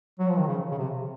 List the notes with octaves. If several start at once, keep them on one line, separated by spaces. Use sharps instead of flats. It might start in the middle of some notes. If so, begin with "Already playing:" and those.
F#3
F3
D#3
C#3
C#3
C3